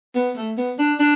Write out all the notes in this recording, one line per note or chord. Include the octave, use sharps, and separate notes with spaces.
B3
A3
B3
D4
D4